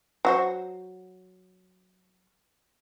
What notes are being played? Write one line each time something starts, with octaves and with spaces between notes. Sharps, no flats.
F#3 F#4 C5